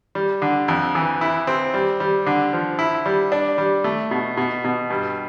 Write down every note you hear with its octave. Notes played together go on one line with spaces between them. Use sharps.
G3
D3
F2
E3
E4
C4
G3
G3
D3
F3
E4
G3
D4
G3
A3
B2
B2
B2
G2